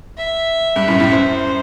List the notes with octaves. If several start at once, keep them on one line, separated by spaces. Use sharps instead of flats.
E5
G2
F#2 A2
F#2 A2
F#2 C5